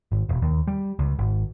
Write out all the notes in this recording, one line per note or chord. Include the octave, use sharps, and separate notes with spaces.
G#1
E1
D#2
G3
C#2
G#1